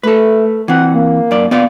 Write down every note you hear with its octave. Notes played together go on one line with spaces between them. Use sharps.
A3 A4 B4
E3 C4 F#5
A#3
F#2 D5
B3 D5 F5